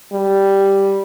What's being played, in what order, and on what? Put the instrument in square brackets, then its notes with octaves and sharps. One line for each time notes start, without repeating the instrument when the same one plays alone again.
[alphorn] G3